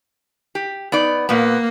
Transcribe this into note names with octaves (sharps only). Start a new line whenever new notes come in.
G4
B3 D#4 D5
A#2 A#3 B3